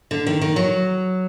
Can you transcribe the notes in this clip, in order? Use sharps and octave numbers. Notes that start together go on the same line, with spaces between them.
D3
D#3
D#3
F#3